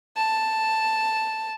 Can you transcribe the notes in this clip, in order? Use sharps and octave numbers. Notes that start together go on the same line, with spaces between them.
A5